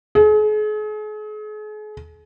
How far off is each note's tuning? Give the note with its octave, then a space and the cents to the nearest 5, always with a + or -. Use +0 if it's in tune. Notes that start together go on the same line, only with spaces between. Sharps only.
G#4 +40